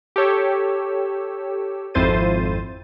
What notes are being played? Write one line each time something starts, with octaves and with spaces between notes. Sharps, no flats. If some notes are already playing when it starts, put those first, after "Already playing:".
G4 A4 C#5 E6
G#1 F2 E4 C5 A6 D#7